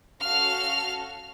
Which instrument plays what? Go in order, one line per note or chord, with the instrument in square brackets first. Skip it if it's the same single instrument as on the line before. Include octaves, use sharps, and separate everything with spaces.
[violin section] C#4 F#4 A4 F5 F6